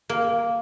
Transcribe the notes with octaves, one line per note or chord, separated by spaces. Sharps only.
A#3